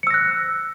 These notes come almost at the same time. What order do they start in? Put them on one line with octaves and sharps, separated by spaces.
C#7 E6 A#6 F#6